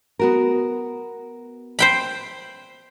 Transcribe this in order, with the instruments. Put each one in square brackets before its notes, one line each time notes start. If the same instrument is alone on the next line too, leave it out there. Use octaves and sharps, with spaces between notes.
[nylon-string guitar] B3 F#4 A#4
[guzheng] C5 G5 B5